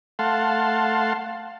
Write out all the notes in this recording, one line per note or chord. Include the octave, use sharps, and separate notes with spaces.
A3 F5 F#5 A5 C6